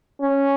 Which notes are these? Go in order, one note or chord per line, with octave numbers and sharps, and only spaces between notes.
C#4